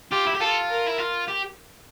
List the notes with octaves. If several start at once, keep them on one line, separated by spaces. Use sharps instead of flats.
F4 G4
E4
G4
F4 A4
A#4
E4
F4
G4